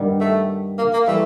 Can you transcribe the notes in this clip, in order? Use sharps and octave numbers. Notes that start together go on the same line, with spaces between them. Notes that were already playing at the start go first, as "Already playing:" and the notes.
Already playing: G2 D#3 G3 B3
A3
A#3
A#3
E3 G3 A3 A#3